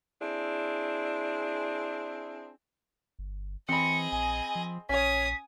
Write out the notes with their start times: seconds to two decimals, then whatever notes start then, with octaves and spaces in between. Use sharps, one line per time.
0.21 C4 D4 E4 G#4
3.19 G1
3.69 E3 C4 G#4 D#5 B5 C#7
4.12 A#1 G#5
4.55 F3
4.89 A#1 C#4 C#5 G#5 D#6 B6